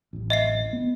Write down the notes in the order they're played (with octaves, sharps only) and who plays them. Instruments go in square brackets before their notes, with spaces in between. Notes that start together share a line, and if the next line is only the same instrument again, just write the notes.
[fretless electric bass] D1 A1
[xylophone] D#5 E5 C7
[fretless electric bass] B3